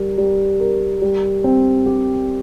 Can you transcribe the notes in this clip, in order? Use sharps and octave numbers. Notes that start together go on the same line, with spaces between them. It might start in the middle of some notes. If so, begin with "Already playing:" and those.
Already playing: G3 A#4
G3
A#4
G3
C4
G4